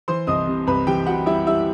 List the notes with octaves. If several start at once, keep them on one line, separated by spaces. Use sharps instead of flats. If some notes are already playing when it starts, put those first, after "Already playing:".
E3 C5 C6
C2 D#5 D#6
C3
C2 B4 B5
E3 G4 G5
C3 F#4 F#5
G3 E4 E5
G3 E4 E5